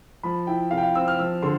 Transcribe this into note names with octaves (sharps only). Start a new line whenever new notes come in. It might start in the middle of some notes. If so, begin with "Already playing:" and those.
F3 B5
E4 G5
C3 F5
G5
F5
C4 E6
F6
F3 E6
D3 C6